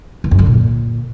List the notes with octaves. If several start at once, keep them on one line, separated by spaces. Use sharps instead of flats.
E2
F#2
D3
A#2